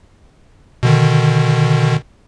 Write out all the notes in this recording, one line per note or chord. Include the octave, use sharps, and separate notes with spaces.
B2 D3 D#3